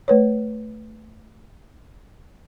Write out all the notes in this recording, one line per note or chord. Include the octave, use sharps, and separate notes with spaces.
A3 B4 C#5